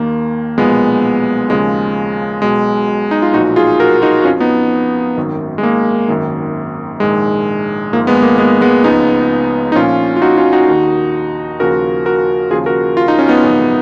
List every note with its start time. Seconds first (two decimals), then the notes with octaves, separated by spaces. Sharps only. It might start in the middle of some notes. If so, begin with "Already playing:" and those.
Already playing: D#2 D#3 A#3
0.58 B1 A#2 F3 G#3 B3
1.50 D#2 C#3 F3 G#3
2.42 B1 B2 G#3
3.11 D#4
3.22 F4
3.34 B1 A#2 F3 D#4 F#4
3.56 F4 G#4
3.80 F#4 A#4
4.02 D#4 F#4
4.22 F#4
4.25 F2 F3 C#4 F4
4.40 B3 D#4
5.17 G#1 F#2 D#3
5.58 G#3
5.63 A#3
6.08 G#1 F#2 D#3
7.00 A#1 G#2 D#3 G#3
7.92 G#1 G#2 F3 A#3
8.07 G#3 B3
8.22 A#3
8.38 G#3 B3
8.61 G#3 B3
8.84 C#2 C#3 F3 B3 D#4
9.72 D#4
9.75 A#1 A#2 F3 C#4 F4
10.16 F4
10.22 D#4 F#4
10.37 C#4 F4
10.53 D#4 F#4
10.68 D#2 D#3
11.60 D#2 C#3 F3 F#4 A#4
12.05 F#4 A#4
12.51 D#2 C#3 F3 F4 G#4
12.66 F#4 A#4
12.97 F4
13.08 D#4
13.19 C#4
13.28 B3 D#4
13.44 G#1 F#2 C#3 F3